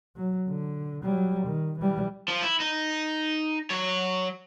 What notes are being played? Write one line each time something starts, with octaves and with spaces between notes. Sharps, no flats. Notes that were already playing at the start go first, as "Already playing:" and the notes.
F#3
D3
F#3 G3
D#3
E3 G3
F3
E4
D#4
F#3 C#5